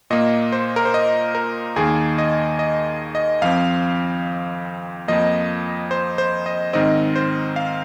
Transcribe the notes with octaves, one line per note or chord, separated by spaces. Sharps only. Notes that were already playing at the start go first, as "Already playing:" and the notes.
A#2 A#3 D#5
C5
A#4
C5
D#5
A#4
D#2 D#3 A#3 G#4
D#5
D#5
D#5
F2 F3 C4 F5
F2 F3 A#3 D#5
C5
C5
D#5
G#2 D#3 C4 D#5
C5
F5